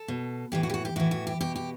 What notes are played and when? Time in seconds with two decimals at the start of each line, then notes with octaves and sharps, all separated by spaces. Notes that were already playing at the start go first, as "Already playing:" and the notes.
Already playing: A4
0.08 B2
0.52 A2 E3 G4
0.63 F#4
0.70 G4
0.74 F#4
0.85 G4
0.96 A2 E3 F#4
1.11 F#4
1.27 G4
1.41 B2 G4
1.56 G4